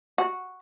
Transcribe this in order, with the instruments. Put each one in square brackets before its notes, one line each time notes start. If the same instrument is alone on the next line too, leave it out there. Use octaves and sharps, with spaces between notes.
[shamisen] F#4